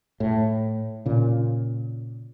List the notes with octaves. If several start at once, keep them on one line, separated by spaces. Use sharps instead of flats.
A2
A#2 C#3